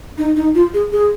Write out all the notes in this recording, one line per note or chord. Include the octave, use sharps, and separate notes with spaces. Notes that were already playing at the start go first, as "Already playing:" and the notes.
D#4
D#4
F4
G#4
G#4